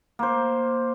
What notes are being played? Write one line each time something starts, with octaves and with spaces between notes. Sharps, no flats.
A#3 C5